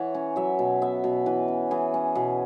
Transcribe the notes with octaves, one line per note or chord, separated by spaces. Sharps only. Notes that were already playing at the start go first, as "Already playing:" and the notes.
Already playing: E3 C#5 E5 F#5
C#4
F#3 E5
B2
B3 E5
B2
E3 B4
C#4
E3 G#4
C#4
B2